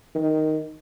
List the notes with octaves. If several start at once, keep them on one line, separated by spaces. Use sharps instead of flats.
D#3